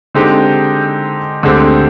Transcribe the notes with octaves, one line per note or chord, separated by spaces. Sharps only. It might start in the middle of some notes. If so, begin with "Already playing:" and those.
D3 G#3 C4 D#4 G4
D2 D3 G#3 C4 G4